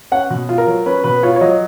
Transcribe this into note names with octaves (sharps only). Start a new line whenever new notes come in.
C#4 F#5
B2
F4
A#4
F#3
C#4 B4
B2 B4
F4 C#5
C#5
F#3 D#5